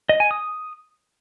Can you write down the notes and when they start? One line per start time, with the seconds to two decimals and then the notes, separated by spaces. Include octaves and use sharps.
0.09 D#5
0.20 G#5
0.31 D#6